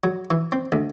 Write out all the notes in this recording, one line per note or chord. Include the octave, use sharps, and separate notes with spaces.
F#3
E3
C4
D2